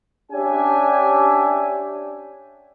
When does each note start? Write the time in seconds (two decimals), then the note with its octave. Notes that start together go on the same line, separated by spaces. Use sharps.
0.32 C#4 D4 G4 E5 G5 G#5